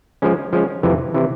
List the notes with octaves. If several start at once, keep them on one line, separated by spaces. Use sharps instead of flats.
F3 G#3 C#4
F3 G#3 C#4
F2 C3 E3
C3 E3